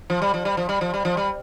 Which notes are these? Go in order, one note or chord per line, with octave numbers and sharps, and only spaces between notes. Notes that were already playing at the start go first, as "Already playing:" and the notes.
F3
G3
F3
G3
F3
G3
F3
G3
F3
G3